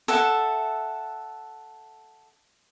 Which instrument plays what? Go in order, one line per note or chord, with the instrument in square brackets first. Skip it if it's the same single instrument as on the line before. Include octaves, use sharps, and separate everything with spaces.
[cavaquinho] A4 E5 F#5